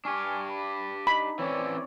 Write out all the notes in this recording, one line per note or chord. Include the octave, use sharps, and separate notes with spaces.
D4 G4 G#5 C#6 F6
B5 D6
D#4 B5
E3 C4 C#4 C#5 D5